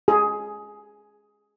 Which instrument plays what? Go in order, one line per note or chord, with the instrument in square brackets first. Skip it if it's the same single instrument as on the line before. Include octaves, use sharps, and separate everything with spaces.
[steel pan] G#4